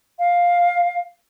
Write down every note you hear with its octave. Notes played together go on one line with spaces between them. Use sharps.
F5